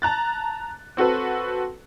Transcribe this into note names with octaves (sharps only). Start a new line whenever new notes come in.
A5 A#5 F#6 A6
C4 F#4 A4 B4